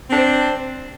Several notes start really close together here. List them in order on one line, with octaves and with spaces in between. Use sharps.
C4 D4 C5